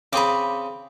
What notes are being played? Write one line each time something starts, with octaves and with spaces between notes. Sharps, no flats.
C#3 C4 G#4 B5 D6